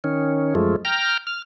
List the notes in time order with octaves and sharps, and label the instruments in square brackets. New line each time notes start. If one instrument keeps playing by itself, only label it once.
[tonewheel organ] D#3 C#4
F#2 F3 G#3 A3
G5 A#5 F6
F6